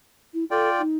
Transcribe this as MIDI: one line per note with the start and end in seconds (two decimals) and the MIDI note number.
0.34 0.44 64
0.51 0.82 65
0.51 0.69 69
0.51 0.82 74
0.51 0.82 79
0.79 0.98 63